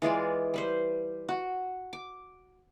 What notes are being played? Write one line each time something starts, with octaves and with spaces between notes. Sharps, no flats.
E3 G#3 F4 D5
G3 B4 C5
F#4
D6